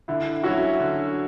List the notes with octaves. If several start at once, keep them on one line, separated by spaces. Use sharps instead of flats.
D3 E4
F#3 C#4 E4 F#4
D3